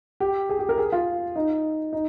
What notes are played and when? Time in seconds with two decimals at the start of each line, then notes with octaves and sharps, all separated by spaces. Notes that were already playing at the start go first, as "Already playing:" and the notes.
0.20 G4
0.49 G#4
0.59 G4
0.69 A#4
0.78 G#4
0.92 F4
1.36 D#4
1.93 D#4